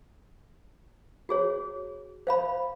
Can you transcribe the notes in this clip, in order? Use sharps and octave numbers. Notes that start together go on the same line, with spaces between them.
F#4 G#4 C#5
C5 F5 B5